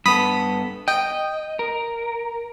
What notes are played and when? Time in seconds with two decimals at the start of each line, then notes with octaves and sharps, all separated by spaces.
0.06 G2 B3 A4 B5 D#6 B6
0.88 D#5 G5
1.59 A#4